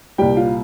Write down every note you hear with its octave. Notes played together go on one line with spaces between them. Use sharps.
C2 A#2 G3 G4 G5
F4 F5